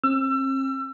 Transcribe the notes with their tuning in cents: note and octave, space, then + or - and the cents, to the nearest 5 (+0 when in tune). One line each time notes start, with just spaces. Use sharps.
C4 +40 E6 +30